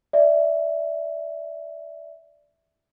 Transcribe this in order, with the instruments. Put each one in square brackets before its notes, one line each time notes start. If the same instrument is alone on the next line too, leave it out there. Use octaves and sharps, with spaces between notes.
[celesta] D5 E5